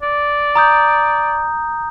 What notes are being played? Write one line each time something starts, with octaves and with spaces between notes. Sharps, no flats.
D5
A#5 D#6 G6